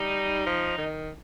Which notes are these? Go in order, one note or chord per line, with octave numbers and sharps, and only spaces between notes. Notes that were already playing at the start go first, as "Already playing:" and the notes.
Already playing: G3 D#4
F3
D#3